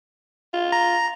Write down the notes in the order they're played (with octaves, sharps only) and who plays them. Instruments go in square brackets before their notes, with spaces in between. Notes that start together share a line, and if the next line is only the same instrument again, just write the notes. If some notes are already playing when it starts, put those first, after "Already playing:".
[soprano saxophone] F4
[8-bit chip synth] A#5